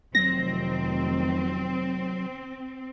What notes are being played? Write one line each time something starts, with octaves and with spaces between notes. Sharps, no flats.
F1 D#3 F#3 C4 A#6